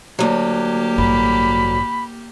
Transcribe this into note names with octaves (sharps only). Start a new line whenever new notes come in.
D2 F#3 A#3 G4
A1 G2 B5